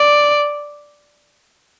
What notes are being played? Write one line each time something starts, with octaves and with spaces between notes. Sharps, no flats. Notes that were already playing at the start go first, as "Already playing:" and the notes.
Already playing: D5